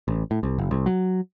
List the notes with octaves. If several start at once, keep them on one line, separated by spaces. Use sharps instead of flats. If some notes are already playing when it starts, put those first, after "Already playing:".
A1
A2
C2
F#1
C2
F#3